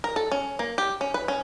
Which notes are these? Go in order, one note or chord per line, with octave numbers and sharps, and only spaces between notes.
A#4
A4
C#4
A#3
G4
C#4
B4
C#4